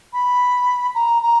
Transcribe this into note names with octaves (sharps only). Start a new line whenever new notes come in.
B5
A#5
A#5